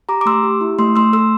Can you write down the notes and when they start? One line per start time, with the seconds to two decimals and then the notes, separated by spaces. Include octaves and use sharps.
0.09 G4 A#5 D6
0.21 D6
0.26 A3 C6 E6
0.43 G4
0.61 E4
0.79 A3 C6 E6
0.96 A3 C6 E6
1.13 A4 C6 E6